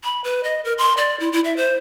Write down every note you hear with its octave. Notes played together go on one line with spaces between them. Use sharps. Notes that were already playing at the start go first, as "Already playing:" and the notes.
B5
B4
D#5
A#4
C6
D5
E4
E4
E5
C5